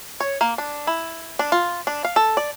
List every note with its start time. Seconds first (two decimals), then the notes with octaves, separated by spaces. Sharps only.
0.20 C#5
0.41 A#3
0.58 D4
0.87 E4
1.39 D4
1.52 F4
1.87 D4
2.05 F5
2.16 A4
2.37 D5